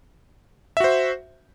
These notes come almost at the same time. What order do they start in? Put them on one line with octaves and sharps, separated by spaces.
E5 F#4 C5